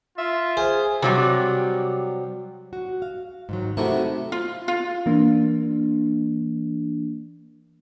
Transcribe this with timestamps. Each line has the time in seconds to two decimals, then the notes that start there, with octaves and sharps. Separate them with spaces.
0.18 F4 E5
0.57 G#4 C5
1.02 C3 F#3 G3
2.73 F#4
3.02 F5
3.49 G#2 D#3 F#3
3.77 C3 D#3 A3 E4 F#4
4.32 F4
4.68 F4
5.06 E3 A#3 D4